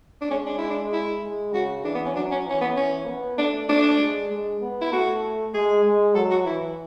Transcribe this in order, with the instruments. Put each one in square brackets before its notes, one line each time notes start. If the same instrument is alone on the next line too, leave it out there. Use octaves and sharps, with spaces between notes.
[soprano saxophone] D4
[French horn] G#3 [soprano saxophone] C#4
[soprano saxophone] D4
E4
D4
E4
[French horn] G#3
[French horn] C#3 [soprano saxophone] F#4
[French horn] E3 [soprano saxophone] D4
[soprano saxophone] B3
C#4
[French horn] F#3 [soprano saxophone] D4
[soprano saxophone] C#4
[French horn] E3 [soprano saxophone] C#4
[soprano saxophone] B3
[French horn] E3 [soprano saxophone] C#4
[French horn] B3
[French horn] A3 [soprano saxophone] D4
[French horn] A3 [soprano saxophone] D4
[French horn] G#3
G#3
B3
[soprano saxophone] E4
[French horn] A3 [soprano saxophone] F#4
[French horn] G#3 [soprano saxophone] G#4
[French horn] G#3
[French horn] F#3 [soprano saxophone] A4
[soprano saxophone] F#4
[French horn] E3 [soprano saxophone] E4